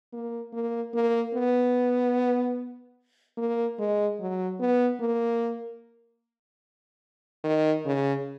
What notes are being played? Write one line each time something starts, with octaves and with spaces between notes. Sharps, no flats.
A#3
A#3
A#3
B3
A#3
G#3
F#3
B3
A#3
D#3
C#3